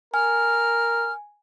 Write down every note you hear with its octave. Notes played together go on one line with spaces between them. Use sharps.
A#4 G#5 F6